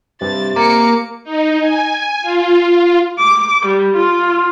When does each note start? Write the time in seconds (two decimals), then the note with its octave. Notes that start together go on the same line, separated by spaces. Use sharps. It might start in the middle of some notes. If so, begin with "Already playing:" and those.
0.21 G2 C3 A6
0.56 A#3 A#5 D6 C#7
1.24 D#4
1.60 G#5
2.22 F4
3.19 D6
3.66 G3
3.96 F4